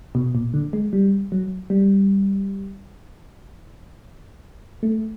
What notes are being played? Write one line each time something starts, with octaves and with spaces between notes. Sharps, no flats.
B2
A#2
D3
G#3
G3
F#3
G3
A3